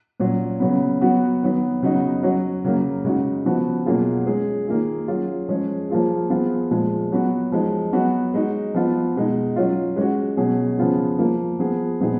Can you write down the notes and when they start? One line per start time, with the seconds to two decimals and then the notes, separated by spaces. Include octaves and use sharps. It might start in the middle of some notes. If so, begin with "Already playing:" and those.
0.20 A#2 F#3 C#4
0.60 C#3 F#3 B3
1.01 F#3 B3 F#4
1.42 D#3 F#3 B3
1.83 C#3 F#3 B3 D#4 F#4
2.23 F#3 C#4 F#4
2.64 C#3 F#3 A#3
3.04 C#3 G#3 D#4 F#4
3.45 C#3 F3 B3 F#4
3.86 B2 F#3 A#3 F4 G#4
4.27 G#3 C#4 G#4
4.68 D#3 A#3 F4 G#4
5.08 F#3 C#4 F4 G#4
5.48 F3 G#3 C#4 G#4
5.90 F3 A#3 F4 G#4
6.30 F3 B3 F4 G#4
6.71 A#2 F3 G#3
7.12 F#3 B3 F#4
7.52 F3 G#3 D#4
7.93 F#3 B3 F#4
8.34 G#3 D#4 F#4
8.74 F3 B3 F4
9.16 B2 G#3 D#4
9.56 F#3 C#4 F4
9.96 G#3 C#4 F#4
10.37 B2 F#3 C#4 G#4
10.78 C#3 F3 B3 F4 G#4
11.19 F3 A#3 F4
11.59 F3 B3 F4 G#4
12.00 A#2 F3 B3 D#4 G#4